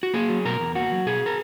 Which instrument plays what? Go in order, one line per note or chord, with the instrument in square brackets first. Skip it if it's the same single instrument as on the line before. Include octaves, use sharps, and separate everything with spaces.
[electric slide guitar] F#4
A#3 G#4
F#3
B2 A#4
E2
A#3 F#4
F#3
B2 G#4
A#4